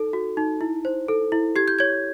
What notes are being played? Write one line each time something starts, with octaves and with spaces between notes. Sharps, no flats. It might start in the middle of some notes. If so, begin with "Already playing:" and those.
Already playing: D#4 A4
F#4
D#4
E4
C5
A4
E4
G4 G#6
G6
C#5 G#6